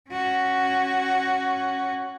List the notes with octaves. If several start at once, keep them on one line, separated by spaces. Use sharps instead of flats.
C#4 F#4